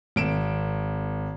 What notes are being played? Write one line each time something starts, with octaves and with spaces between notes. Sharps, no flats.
G#1 D7 E7